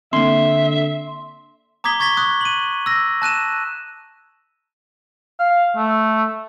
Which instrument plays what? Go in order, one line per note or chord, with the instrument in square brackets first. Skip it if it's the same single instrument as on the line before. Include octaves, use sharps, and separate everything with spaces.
[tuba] D3 [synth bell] A#3 C4 [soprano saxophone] E5 [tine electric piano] C6
[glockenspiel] A#5 D6 D#6 G#6 B6 G7
C#6 G#6 A6 B6 G7
C#6 D#6 F#6
D#7 F#7
E6 A#6
A5 F#6 D#7 E7
[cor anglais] F5
A3